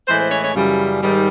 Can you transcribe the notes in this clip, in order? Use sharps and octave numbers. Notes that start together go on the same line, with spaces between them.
A2 E3 G#3 C5
C5
C#5
C#5
F#2 C#3 E3 G3
G#2 D#3 G3